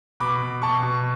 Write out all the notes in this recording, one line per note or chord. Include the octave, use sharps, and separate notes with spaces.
B2 B5 D6
B2
B2 A5 C#6
B2